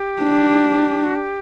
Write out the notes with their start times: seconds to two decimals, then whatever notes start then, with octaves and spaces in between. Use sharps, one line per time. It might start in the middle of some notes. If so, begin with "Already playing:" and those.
Already playing: G4
0.21 D4
1.05 F#4
1.15 G4